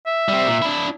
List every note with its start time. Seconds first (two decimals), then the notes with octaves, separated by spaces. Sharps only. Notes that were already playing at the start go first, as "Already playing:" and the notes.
0.07 E5
0.29 G3 C4
0.47 A#2
0.62 D4 E4